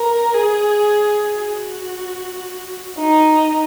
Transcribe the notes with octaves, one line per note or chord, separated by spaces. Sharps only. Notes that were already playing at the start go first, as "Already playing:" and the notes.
Already playing: A#4
G#4
F#4
D#4